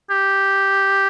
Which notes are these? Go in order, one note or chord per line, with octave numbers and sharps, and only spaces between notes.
G4